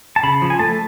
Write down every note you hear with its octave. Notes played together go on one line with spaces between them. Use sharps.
A5
C#3 B5
F3
G#5
A3 A5